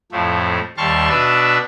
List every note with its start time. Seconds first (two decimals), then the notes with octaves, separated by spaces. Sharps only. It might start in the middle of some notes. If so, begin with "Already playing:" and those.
0.12 F2 A2 F3 A3
0.77 D#2 G3 A5 C6 C#6 F6
1.09 B2 D4 B4 E5